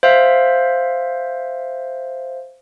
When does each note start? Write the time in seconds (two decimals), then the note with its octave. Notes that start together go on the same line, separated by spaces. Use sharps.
0.03 C5 E5 F5